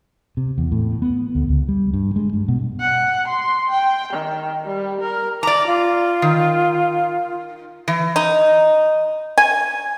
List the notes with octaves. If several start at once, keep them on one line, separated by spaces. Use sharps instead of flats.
C3
E2
A2
B3
D2
C#2
G3
G2
G#3
G2
B2
F#5
C6
G5
D#3
G3
A#4
D5 A#5 D6
F4
D#3
E3
D#4
G#5